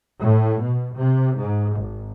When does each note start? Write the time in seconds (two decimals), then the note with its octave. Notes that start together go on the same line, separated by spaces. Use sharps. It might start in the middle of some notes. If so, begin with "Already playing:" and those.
0.22 A2
0.63 B2
0.96 C3
1.39 G#2
1.78 G#1